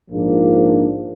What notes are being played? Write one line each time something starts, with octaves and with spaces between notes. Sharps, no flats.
A#1 G#2 F3 A#3 D4